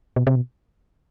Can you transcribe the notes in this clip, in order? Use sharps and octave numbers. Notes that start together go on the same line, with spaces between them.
B2
C3
B2